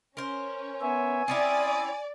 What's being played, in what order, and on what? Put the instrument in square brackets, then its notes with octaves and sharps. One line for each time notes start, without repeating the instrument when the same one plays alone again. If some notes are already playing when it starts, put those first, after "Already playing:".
[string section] C#4 [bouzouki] A#4 C5
[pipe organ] B3 C#5 E5 [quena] G#5
[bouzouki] C4 C#4 E4 [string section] D5 [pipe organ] D#6